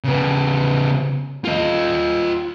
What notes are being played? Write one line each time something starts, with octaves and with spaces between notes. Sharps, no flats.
C#3 B3
F4 D#5